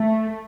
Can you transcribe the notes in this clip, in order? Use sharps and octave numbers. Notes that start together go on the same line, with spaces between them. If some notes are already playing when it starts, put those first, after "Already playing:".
Already playing: A3